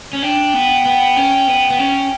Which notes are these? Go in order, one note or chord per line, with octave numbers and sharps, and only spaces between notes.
C#4
D4 G5
B3
B3
C#4
B3
B3
C#4